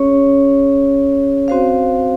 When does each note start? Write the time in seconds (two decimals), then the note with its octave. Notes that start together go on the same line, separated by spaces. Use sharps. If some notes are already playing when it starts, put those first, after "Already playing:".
Already playing: C#4 G#4 C#5
1.48 C4 F#4 C5 F5